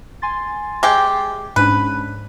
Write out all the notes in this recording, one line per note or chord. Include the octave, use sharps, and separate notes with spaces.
G#5 C6 A6
G#3 G4
G#2 C#4 D4 B4